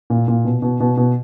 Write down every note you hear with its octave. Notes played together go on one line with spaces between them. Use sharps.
A#2
A#2
B2
B2
B2
B2